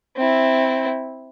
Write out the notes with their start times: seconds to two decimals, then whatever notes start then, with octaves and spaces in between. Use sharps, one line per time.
0.16 C4 E4